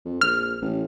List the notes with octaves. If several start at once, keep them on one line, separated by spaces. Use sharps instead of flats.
F2
A#1 F6
A1